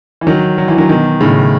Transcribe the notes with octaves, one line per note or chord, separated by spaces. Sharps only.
E3
D#3 F#3
F#3
E3
D#3 F#3
B2 D#3
A2 C#3